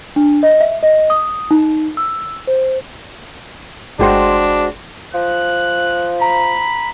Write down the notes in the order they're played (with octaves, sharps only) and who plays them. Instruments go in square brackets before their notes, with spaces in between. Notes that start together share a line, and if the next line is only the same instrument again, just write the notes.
[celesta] D4
D#5
E5
D#5
D#6
D#4
E6
C5
[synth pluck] G1 G5 C6 [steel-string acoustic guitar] G#3 F#4 C5 [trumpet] D4
[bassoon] F3 [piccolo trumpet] F#6
[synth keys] A#5 [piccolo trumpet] B5